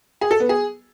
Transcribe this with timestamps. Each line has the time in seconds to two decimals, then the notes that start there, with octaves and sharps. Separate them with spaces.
0.21 G#4
0.31 A4
0.40 B3
0.49 G#4